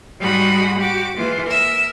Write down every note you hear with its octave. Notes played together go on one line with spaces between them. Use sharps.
G#2 G3 G#3 F#4 B5 D#6
F#4 G4 D6
E3 G#3 A#3 F4
A#4 E5